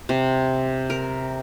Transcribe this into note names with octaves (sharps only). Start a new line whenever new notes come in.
C3
A#4